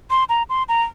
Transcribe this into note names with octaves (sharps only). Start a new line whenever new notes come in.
C6
A#5
C6
A#5